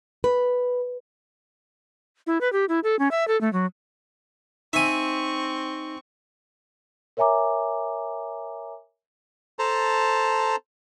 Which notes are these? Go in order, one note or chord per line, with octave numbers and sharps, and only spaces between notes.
B4
E4
B4
G4
E4
A4
C#4
E5
A4
A3
F#3
C4 D#4 E5 G#5 C#6
A#4 C#5 E5 G#5 A#5 D6
A4 C5 A5 A#5